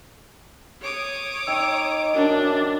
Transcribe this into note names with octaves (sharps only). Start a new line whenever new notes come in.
C#5 D6 D#6
D#4 D#5 G5 E6
F#2 D4